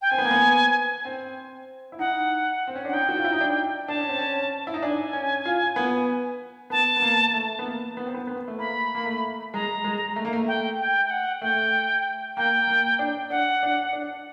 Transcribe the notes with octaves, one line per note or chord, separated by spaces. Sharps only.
G5
C4 G#5
B3
A#3
B3
C4
E4
D#4 F#5
C4
C#4
D4 F#5
D#4 G5
F#4
F4
E4
D#4
D4
D4 A5
C#4
C4
C#4
E4
D#4
D4 G#5
C#4
F4
B3
B3 A5
B3
A#3
A3
B3
A#3
B3
C4
B3
B3
A3
A#3 B5
A#3
A3
G#3 A#5
G#3
A3
A#3
A3
G5
G5
G5
F#5
A3 G5
A#3 G5
A#3
D4
D4 F#5
D4
D4